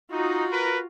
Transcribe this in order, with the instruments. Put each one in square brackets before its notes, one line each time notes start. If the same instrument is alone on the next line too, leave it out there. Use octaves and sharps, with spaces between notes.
[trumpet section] D#4 [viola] F4 F#4
[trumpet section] A#4 B4